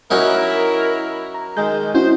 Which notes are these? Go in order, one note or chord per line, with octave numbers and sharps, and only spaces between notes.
F#3 C#4 D#4 E4 A#4
A#5
D#3 G#3 G6
C#4 E4 F#4 C5